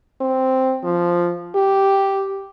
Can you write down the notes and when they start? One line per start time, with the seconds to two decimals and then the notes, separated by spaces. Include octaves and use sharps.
0.21 C4
0.84 F3
1.55 G4